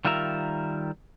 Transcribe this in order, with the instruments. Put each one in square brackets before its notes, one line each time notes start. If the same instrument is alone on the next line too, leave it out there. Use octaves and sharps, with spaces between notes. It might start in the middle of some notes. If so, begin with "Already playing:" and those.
[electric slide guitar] D#3 G3 F4 A#4 E5 A#5